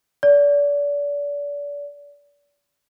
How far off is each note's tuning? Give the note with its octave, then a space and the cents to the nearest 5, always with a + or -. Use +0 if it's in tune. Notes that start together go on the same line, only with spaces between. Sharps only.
D5 -35